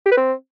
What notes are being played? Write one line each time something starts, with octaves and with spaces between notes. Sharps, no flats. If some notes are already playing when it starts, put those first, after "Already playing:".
G4
B4
C4